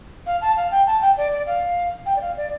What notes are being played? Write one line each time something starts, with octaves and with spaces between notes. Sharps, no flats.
F5
A5
F5
G5
A5
G5
D5
D5
F5
G5
D5
F5
D5